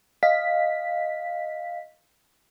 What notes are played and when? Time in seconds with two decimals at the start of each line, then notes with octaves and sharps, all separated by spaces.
0.23 D#5 F5 B6